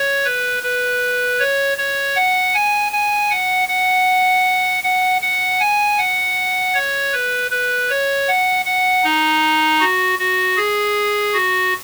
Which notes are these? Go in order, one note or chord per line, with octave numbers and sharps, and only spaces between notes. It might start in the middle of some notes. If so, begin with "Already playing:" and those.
Already playing: C#5
B4
B4
C#5
C#5
F#5
G#5
G#5
F#5
F#5
F#5
F#5
G#5
F#5
C#5
B4
B4
C#5
F#5
F#5
D#4
F#4
F#4
G#4
F#4